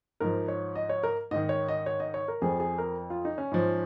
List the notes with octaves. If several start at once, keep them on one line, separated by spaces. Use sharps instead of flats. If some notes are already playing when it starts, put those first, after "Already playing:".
G#2 F3 A#4
C#5
D#5
C#5
A#4
G#2 D#3 D#5
C#5
D#5
C#5
D#5
C#5
A#4
F2 F3 G#4
G#4
A#4
F4
D#4
C#4
G#2 F3